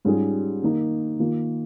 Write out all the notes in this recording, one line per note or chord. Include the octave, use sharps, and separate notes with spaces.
G#2 G3 C#4 F4 G#4
D#3 A#3 D#4
D#3 A#3 F4